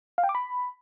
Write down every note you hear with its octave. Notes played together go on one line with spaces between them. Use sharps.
F5
G5
D6
B5